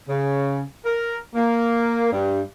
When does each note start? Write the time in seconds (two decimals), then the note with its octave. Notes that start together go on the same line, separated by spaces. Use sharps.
0.09 C#3
0.85 A#4
1.35 A#3
2.12 G2